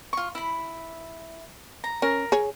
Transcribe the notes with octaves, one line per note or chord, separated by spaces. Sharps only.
F4 C#6
E4 B5
A#5
C#4 A#4
G#4 C#5